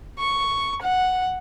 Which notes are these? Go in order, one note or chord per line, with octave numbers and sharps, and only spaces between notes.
C#6
F#5